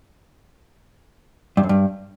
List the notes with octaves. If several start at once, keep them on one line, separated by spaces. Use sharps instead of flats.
G2
F#2
G2